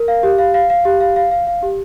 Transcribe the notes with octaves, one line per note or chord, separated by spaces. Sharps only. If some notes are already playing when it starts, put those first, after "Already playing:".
Already playing: A#4
F5
G4
F5
F5
F5
G4
F5
F5
F5
F5
G4